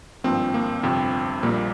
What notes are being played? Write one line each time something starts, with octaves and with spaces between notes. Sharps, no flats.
G#1 G2 F3 A#3 C4
A#3
G1 F2 C3 C4
A#1 A#2 G3 A#3